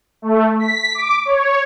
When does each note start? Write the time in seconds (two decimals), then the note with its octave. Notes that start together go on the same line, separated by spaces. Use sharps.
0.22 A3
0.59 B6
0.95 D6
1.25 C#5